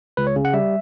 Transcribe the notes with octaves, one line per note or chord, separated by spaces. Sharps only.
C#2 B4
C#5
C#3
F#5
G3 E5